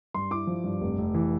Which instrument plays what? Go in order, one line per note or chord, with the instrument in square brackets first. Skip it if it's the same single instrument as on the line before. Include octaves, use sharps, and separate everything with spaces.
[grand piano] G2 C6
E4 D6
F3
G2
F1
F1
E3